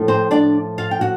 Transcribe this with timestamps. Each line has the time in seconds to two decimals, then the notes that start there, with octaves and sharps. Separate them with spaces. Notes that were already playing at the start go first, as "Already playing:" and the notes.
Already playing: A2 F3 A3
0.08 C4 C5
0.31 D4 D5
0.78 F4 F5
0.91 G5
1.01 F#4 F#5